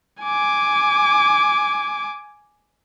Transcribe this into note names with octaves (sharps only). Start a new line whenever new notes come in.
G#5 D6